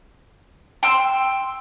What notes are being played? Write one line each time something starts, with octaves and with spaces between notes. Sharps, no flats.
G5 C6 E6